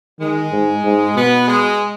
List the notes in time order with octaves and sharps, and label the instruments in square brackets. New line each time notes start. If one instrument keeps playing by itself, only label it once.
[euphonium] D#3 [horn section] G#3
[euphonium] G#2
G#2
[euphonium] B2 [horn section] B3
[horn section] G#3